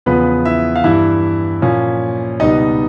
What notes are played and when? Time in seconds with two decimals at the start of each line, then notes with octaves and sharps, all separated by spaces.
0.06 E2 C#3 F3 B3 B4
0.45 E4 E5
0.76 F5
0.84 G2 E3 G3 E4 E5
1.62 A#2 F3 A#3 C#4
2.40 C#2 B2 G3 B3 D#4 D#5